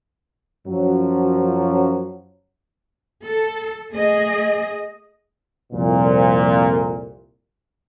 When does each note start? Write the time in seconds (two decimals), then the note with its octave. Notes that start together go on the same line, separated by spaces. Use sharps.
0.67 F#2 F3 F#3
3.26 A4
3.93 A3 G#4 D#5
5.72 C2 F2 A#2